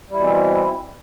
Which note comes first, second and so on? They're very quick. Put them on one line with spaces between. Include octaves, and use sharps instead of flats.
G3 E4 B2 E3 C4